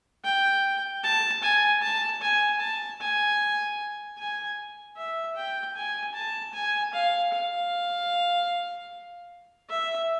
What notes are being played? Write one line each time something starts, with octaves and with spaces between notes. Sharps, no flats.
G5
A5
G#5
A5
G#5
A5
G#5
G#5
E5
G5
G#5
A5
G#5
F5
F5
E5